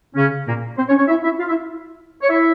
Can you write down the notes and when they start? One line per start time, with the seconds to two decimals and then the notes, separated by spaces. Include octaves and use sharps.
0.15 C#3 C#4
0.46 A#2 A#3
0.77 C4 C5
0.88 C#4 C#5
0.98 C#4 C#5
1.08 E4 E5
1.23 E4 E5
1.39 F4 F5
1.49 E4 E5
2.22 C#5
2.29 E4 E5